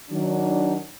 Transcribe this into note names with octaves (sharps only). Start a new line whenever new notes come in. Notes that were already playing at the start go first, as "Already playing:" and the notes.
D#3 F#3 D4